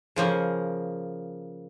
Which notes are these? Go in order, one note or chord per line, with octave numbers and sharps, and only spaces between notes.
C#3 F3 A#3